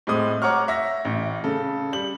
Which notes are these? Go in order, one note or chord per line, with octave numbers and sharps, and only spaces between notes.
A2 G#3 C4 D#6
C#5 F#5 A#5 C#6 D6 F6
E5 A#6
A1
C#3 A4
G3 F#7